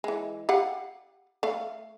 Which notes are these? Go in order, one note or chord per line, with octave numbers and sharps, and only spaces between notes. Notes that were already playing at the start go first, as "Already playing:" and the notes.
E3 G#3
G4 F5 F#5
A3 F5